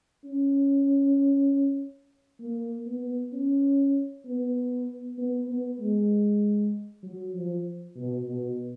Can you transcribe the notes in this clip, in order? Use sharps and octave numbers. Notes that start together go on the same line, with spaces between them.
C#4
A#3
B3
C#4
B3
B3
B3
G#3
F#3
F3
B2
B2